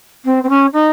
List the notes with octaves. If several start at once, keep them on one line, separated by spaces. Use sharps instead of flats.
C4
C4
C#4
D#4